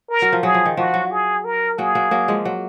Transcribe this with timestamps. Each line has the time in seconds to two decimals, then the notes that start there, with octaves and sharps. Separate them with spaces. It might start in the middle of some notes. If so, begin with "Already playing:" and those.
0.10 A#4
0.22 F#3
0.32 F3
0.43 F#3 G#4
0.54 F3
0.66 D#3
0.77 F3 F#4
0.94 F#3
1.12 G#4
1.45 A#4
1.78 F#3 A#3 G#4
1.95 F#3 A#3
2.11 F#3 A#3
2.28 F3 G#3
2.45 F#3